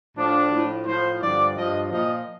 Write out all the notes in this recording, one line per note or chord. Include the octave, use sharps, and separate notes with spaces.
A2 F3 D4
A2 F3
A2 F3 C5
G2 D3 F3 D5
G2 F3 D#5
A#2 F3 D#5